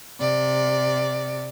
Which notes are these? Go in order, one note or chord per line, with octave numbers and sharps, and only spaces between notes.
C3 D5